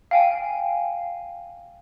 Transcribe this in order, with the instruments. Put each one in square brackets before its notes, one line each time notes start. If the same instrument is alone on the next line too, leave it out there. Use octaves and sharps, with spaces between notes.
[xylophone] F5 G5 G#5